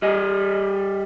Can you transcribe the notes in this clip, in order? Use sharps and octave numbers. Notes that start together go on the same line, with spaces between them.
G3 D#5